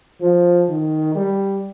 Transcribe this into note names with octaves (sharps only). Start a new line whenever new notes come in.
F3
D#3
G3